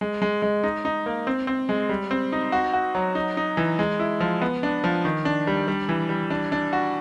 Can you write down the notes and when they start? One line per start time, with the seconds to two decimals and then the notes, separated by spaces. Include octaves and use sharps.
0.01 G#3
0.22 G#3
0.42 G#3
0.63 D#4
0.85 D#4
1.06 A#3
1.27 C4
1.47 C4
1.69 G#3
1.89 G3
2.11 C4
2.32 D#4
2.52 F#4
2.73 F#4
2.95 F#3
3.15 D#4
3.37 D#4
3.57 E3
3.79 G#3
3.99 E4
4.20 F3
4.42 B3
4.63 D4
4.84 F3
5.05 D#3
5.25 D4
5.47 G3
5.68 G3
5.89 E3
6.09 G3
6.30 D4
6.52 D4
6.73 F#4